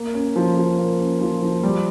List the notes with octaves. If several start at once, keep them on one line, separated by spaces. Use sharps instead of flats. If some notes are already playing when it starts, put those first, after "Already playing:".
Already playing: A#3
C#4
F3
F3
A#3
C#4
F3
F3
G3